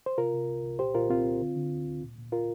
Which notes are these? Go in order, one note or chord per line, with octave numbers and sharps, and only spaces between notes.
C5
C3 F4 A#4
C3
C2
C2
A#2 G4 C5
A#2 F4 A#4
C2 C4 F4
C2
D3
D3
D2
D2
A#2
A#2
F4 A#4